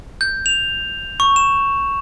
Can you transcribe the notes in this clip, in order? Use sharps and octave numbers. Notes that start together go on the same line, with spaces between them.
G6
F7
C#6
E7